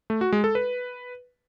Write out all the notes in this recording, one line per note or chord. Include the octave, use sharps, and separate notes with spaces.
A3
F#4
G#3
A4
B4